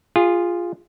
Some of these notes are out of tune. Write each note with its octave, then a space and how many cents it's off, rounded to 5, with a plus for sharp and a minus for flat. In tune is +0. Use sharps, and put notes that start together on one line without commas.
F4 +0 G#4 -25